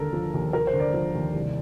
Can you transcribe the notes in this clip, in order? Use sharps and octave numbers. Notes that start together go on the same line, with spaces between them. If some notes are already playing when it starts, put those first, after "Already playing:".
Already playing: D#2 D3 A4 A#4
F3
D#2
D#2 A#4
C5
D3
D5
F3
D#2
C2